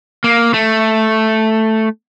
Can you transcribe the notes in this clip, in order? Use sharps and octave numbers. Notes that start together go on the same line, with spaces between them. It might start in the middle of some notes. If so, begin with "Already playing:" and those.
A#3
A3